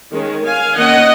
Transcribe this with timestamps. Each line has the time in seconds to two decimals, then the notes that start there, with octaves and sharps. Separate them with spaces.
0.13 D#3 G#3 C#4
0.45 F5 G#5
0.76 D#3 A#3 C#4 D#5 F#5